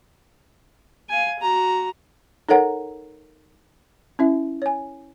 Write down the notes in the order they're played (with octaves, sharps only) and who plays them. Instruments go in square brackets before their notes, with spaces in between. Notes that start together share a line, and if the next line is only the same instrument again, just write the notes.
[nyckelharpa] F5 G#5
F#4 A#5
[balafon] D#4 A4 A#4 C#5 F#5 A#5
C#4 E4 E5
C#5 G#5